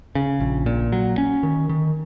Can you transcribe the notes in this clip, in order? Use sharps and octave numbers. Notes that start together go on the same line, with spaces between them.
C#3
A#1
A#2
F#3
C#4
D#3
D#3